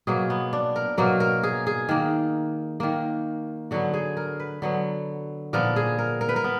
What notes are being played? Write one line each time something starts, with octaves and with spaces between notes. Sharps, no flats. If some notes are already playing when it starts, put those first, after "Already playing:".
B2 F#3 A#3 G#4
B3
D4
A#4
B2 F#3 A#3 A#4
A#4
G#4
G#4
D#3 A#3
D#3 A#3
D3 F#3 B3 F#4
G#4
A#4
B4
D3 F#3 B3
A#2 F3 B3 A#4
G#4
A#4
A#4
B4
A#4
B3